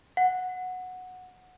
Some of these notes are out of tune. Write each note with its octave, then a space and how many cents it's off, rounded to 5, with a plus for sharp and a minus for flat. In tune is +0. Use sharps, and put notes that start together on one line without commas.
F#5 -10